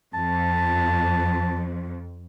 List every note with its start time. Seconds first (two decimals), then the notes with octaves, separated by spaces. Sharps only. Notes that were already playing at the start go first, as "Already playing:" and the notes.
0.14 F2 A5